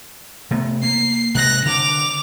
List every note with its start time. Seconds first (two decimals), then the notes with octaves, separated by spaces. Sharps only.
0.51 C3 A3 B3
0.83 A#3 C7
1.35 C3 G#3 F#6 A#6
1.66 D3 D6 F7